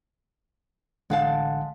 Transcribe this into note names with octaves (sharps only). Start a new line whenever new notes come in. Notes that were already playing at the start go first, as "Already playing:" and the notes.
A1 D3 G#3 F5 F#5 A5